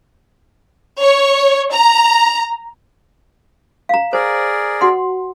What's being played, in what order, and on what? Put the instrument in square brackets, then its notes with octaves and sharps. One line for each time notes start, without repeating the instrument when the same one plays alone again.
[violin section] C#5
A#5
[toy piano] F5 A#5
[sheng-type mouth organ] G#4 A#4 D5 [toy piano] C5
[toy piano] F#4 F#5 C6